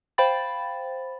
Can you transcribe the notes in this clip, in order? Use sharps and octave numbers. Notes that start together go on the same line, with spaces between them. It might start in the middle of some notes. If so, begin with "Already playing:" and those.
C5 F5 G5 B5 A6